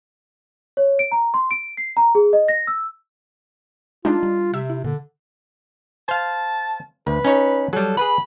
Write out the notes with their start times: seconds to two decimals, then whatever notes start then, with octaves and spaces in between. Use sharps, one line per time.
0.77 C#5
0.99 D7
1.12 A#5
1.34 C6
1.51 D7
1.77 C7
1.97 A#5
2.15 G#4
2.33 D#5
2.48 A#6
2.67 E6
4.05 G#3 D4 D#4 F4
4.23 G3
4.54 C3 E5
4.70 E4
4.84 A#2 D3
6.09 C5 F5 A5
7.07 D2 B4
7.25 C#4 D#4 C#5
7.73 F#3 G3 A4
7.97 G#4 B4 F#5 B5